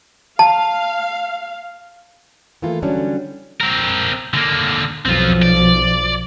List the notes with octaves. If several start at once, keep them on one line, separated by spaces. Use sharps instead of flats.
F5 A5
E3 A3 A#3 F4
D3 F#3 G3 C#4 D4
C4 A#4
D3 A#3
B1 F3 C4 F4
D5